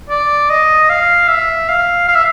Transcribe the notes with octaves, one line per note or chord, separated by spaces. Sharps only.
D5
D#5
F5
E5
F5
F5
E5